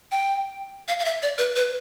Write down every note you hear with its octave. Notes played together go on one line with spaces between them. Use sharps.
G5
F5
F5
E5
D5
B4
B4